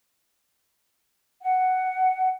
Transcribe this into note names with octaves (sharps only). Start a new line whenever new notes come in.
F#5